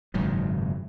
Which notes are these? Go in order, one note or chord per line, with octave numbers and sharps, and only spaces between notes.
F#1 G#2 D#3 F#3